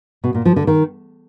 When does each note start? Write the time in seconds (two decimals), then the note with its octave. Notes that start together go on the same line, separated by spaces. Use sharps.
0.24 B2
0.35 A#2
0.45 F3
0.56 D3
0.67 D#3